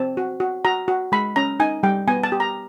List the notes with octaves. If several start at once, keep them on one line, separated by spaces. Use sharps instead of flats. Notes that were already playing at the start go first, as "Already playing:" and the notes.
Already playing: C4 A5
F#4
F#4
F#4 A#5
F#4
G#3 B5
C#4 A#5
D#4 G#5
G3 G5
B3 G#5
A5
G4
A#5